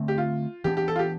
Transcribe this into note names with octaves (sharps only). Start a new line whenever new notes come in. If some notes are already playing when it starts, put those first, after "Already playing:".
Already playing: D3 A3 C4
G4
F4
E3 B3 D4 G4
G4
A4
F4
G4